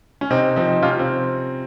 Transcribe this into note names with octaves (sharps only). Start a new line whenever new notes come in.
C#4
C3 C4 D#4
F3 C4 D#4
C3 C#4 F4
C4